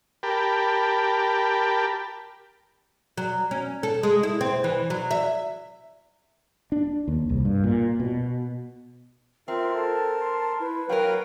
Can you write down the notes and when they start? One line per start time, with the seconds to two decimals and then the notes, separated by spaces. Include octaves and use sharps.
0.23 G4 A#4 G5 A5 B5
3.17 F#3
3.51 C#4
3.83 A4
4.03 G#3
4.23 E4
4.41 C4
4.64 E3
4.90 F#3
5.11 E5
6.72 D4
7.08 D#2
7.29 C2
7.45 G2
7.64 A#2
7.99 B2
9.48 C4 F4 A#4 E5
9.74 A4 A5
10.21 C6
10.61 E4 B4
10.89 F#3 F#4 A#4 B4 C#5 F5 G5